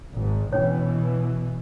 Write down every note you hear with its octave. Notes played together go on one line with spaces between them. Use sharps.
G#1 G#2
B2 E3 C#4 D4 C#5